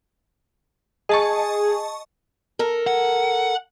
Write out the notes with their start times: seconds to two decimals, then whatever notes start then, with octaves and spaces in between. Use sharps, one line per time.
1.09 G#4 D#5 A5 C#6
2.59 A4 A#4
2.87 F#5